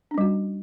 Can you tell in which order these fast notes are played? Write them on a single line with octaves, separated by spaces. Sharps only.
D4 C#4 G3 F#4